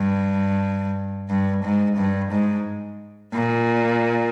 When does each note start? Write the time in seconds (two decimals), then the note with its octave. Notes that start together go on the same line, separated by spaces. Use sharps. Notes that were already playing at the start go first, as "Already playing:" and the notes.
Already playing: G2
1.30 G2
1.64 G#2
1.97 G2
2.32 G#2
3.34 A#2